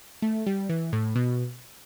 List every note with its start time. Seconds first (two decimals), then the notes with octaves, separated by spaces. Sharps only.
0.22 A3
0.46 G3
0.69 E3
0.93 A2
1.15 B2